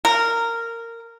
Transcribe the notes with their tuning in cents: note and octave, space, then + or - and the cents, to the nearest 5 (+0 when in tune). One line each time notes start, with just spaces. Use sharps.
A#4 -15